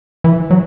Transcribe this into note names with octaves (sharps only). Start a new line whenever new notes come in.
E3
F#3